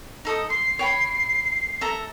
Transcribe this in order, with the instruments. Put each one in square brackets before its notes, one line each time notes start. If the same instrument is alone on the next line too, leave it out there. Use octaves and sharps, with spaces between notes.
[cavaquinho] D#4 A4 D#6
[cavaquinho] C6 [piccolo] C7
[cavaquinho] C#5 G5 B5
A4 E5 A#5